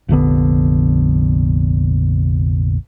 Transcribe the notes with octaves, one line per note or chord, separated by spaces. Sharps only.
F1 A#1 D3 B3